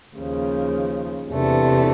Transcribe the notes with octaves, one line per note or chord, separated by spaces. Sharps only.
D#2 C#3 F3
E2 C3 E3 A3 D4